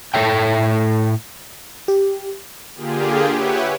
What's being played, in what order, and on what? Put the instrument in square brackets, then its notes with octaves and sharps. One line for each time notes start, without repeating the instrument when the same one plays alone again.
[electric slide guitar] A2 A3 A4 C#5 E5 G5
[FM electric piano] G4
[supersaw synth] D3 A#3 F4 G4 G#4
G4 B4 C#5 E5 F#5 G#5